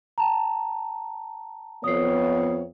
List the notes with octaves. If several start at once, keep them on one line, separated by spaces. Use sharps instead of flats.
G5 A5 A#5
F2 B3 C#5 D#6 C7